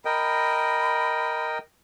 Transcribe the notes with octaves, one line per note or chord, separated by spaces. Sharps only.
A#4 D#5 G5 B5